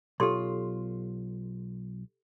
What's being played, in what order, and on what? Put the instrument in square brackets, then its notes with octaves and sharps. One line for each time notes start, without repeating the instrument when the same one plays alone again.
[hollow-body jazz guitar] B1 F4 [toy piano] G4 A4 C6